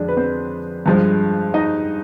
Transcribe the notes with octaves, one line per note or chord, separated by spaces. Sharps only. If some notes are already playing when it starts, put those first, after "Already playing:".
Already playing: F2 D3 G#3 D4
B4
C4 C5
G2 F3 G#3
D#4 D#5